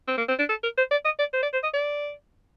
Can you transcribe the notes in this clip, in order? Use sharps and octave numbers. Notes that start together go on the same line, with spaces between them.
C4
A#3
C4
D4
A4
A#4
C5
D5
D#5
D5
C5
D5
C5
D#5
D5